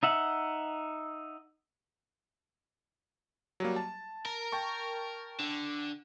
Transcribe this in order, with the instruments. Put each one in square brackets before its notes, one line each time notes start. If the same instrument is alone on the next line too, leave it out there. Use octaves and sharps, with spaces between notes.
[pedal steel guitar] D#4 E5 F#5
[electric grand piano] F#3 G3 A#3
A5
[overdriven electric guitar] A#4
[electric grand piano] G5 A5 C#6
[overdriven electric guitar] D3